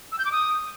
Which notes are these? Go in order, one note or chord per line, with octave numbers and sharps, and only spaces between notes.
E6
G6
D6
D#6